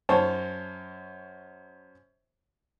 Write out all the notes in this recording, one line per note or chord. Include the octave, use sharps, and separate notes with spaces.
F#2 C5 C#5 A5